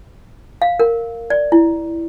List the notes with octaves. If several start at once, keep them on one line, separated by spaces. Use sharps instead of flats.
F5
A#4
D5
E4